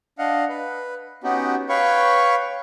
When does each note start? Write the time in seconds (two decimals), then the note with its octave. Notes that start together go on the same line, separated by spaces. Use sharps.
0.19 D4 D#5 F5 F#5
0.49 B4
1.23 B3 C#4 D#4 F#4 G4
1.69 B4 C#5 F5 G5 B5 C#6